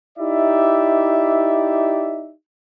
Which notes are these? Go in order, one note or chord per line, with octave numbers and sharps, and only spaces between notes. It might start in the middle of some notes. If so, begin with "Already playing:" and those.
D#4 E4 G4 D5 E5